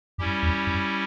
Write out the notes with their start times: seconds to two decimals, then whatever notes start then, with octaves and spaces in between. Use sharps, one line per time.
0.18 F#2 G3 C#4 E4 G4
0.43 E2
0.67 F#2